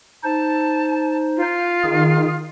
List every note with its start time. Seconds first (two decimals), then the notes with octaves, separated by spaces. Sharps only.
0.24 D#4 C5 A5
1.37 F4
1.84 D#3 G#4